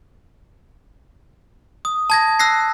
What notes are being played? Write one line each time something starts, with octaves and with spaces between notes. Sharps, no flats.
D#6
A5 G#6 A#6
E6 F#6 A#6 C7